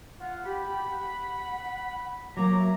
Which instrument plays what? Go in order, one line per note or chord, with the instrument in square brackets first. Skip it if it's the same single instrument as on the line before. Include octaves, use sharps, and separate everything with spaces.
[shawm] F4 [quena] F#5
[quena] G4 [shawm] B5
[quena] F#5
[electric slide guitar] F#3 A#3 [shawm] A#5 [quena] D6
[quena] E5